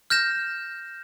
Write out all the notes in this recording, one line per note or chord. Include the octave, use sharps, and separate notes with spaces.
F6 G6 A#6 E7